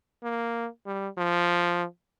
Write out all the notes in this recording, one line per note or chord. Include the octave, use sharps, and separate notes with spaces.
A#3
G3
F3